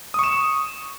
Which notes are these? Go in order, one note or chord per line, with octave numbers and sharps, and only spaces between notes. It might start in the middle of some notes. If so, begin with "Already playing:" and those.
C#6 D#6 E7